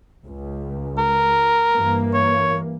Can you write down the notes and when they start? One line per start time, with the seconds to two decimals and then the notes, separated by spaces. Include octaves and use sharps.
0.25 C#2
0.98 A#4
1.73 G2 E3 A#3
2.14 C#5